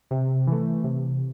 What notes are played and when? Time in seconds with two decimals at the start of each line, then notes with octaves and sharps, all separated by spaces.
0.11 C3
0.47 E3 A3
0.84 C3